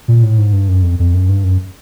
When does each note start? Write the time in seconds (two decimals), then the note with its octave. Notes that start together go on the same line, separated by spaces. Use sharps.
0.08 A#2
0.23 A2
0.38 G#2
0.53 G2
0.68 F#2
0.83 F2
0.99 F2
1.14 F#2
1.29 G2
1.44 F#2